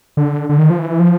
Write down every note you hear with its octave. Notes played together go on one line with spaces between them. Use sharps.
D3
D3
D#3
F3
E3
F3